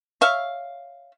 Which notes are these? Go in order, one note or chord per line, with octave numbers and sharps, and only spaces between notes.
C#5 E5 F5